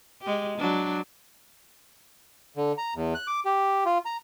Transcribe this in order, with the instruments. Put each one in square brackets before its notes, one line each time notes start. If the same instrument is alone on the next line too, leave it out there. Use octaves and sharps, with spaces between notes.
[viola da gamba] G#3 G4
F#3 D4
[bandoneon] D3
A#5
E2
F#6
D6
G4
F4
A#5